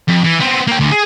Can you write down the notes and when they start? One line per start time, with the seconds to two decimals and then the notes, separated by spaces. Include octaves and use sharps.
0.08 F2
0.24 E3
0.40 B3 C4
0.67 A#3 G5
0.80 D2
0.92 G#4